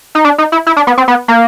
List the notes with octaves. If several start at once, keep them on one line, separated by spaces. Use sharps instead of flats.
D#4
D4
D#4
E4
E4
D4
B3
C4
B3
A#3